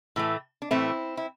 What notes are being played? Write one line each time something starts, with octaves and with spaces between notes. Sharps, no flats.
A2 E3 A3
D4
A2 E3 A3 C4 E4
E4